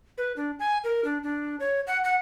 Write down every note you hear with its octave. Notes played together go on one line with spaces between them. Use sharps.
B4
D4
G#5
A#4
D4
D4
C#5
F#5
F#5